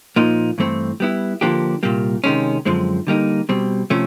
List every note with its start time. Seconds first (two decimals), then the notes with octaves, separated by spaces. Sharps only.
0.16 A#2 F3 A#3 D#4
0.58 G2 E3 A3 C4
1.00 G3 B3 E4
1.41 D3 F3 A#3 D4 G4
1.83 C2 A#2 G3 A#3
2.24 C3 D#3 G#3 C#4
2.65 F#2 D3 F3 G#3 C4
3.07 D3 G3 A#3 D#4
3.49 B2 G3 C4
3.90 C3 F3 A3 C#4